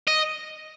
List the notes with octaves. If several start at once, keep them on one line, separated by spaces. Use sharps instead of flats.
D#5